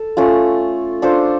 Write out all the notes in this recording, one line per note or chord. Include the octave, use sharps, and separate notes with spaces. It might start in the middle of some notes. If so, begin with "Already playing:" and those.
Already playing: A4
A3 C#4 F4
D4 F4 A4 C5